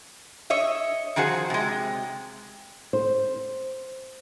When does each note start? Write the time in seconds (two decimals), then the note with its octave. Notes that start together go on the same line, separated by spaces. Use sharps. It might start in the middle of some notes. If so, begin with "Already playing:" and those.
0.50 C#5 D#5 E5
1.16 D#3 F3 F#4 G#4 C5
1.50 C3 G#3
2.93 C5